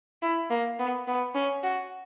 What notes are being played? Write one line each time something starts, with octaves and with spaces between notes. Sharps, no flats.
E4
A#3
B3
B3
C#4
F#4